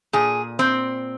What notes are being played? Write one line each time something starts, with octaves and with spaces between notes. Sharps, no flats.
A#2 G#4
C4